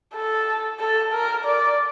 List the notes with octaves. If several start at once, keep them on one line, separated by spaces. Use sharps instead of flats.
A4
A4
A#4
D5